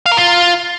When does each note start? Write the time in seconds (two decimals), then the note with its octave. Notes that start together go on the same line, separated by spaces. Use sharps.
0.06 F5
0.12 A#4
0.17 F4